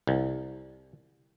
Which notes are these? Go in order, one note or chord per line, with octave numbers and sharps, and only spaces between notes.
C2